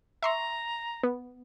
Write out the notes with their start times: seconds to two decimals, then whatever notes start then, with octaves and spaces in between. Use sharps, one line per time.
0.22 E5 A#5 C6 C#6
1.03 B3